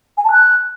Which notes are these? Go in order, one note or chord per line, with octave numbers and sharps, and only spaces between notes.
G#5
A5
F#6